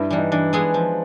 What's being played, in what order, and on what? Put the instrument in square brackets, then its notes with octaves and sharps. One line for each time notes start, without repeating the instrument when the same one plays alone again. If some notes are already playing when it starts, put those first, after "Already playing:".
Already playing: [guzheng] G2 [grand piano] E4
[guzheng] E3 G3 [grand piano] D4
[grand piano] D#4
[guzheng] E3 [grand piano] D4
[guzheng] G#3 B3 E4 G#4
F3